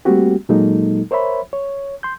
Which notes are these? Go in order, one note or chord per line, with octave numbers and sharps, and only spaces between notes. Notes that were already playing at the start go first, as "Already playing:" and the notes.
G3 A3 A#3 C4 F#4 G4
A#2 F#3 G#3 A#3 D#4 A4
A#4 C5 C#5 E5 B5
C#5
C6 G6